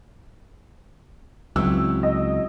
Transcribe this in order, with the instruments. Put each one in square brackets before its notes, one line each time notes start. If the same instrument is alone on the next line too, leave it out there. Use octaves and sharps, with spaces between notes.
[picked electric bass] C#2 [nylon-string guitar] F#3 C4 E4 [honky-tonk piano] E6
[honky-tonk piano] D#5